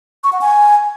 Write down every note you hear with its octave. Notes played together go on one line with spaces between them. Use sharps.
C#6
F#5
G#5